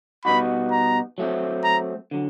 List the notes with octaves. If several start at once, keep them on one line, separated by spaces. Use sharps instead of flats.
B2 G3 B3 D#4 F#4 B5
A#5
F#3 A3 C4
A#5
D3 F#3